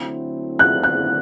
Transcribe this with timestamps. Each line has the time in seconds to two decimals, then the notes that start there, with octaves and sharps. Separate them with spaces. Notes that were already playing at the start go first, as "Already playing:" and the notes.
Already playing: D3 F#3 A3 C4 E4
0.59 F#6
0.83 F#6